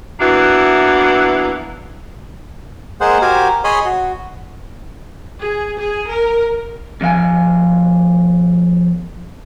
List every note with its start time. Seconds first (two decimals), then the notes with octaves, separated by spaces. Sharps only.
0.20 E3 A#3 B3 D4 E4 F#4
3.01 G#3 A#3 G#4 C5 F#5
3.22 F#4 G4 A#4 C5 F5 G#5
3.64 G#4 C#5 D#5 B5 C6 D#6
3.85 F#4
5.39 G#4
5.79 G#4
6.08 A#4
7.01 B2 F3 F5 G#5